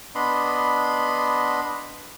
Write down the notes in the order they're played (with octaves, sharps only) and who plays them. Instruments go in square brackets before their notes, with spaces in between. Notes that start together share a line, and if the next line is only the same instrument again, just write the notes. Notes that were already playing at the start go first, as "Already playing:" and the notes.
[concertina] B3 D4 D#5 B5 C6